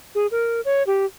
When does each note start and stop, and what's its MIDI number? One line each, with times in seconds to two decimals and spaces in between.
0.15 0.27 68
0.31 0.61 70
0.65 0.83 73
0.87 1.05 67